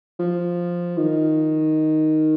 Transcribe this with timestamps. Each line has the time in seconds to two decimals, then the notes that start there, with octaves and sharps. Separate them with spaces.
0.19 F3
0.97 D#3